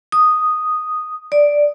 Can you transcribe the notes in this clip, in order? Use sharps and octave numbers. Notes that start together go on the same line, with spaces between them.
D#6
D5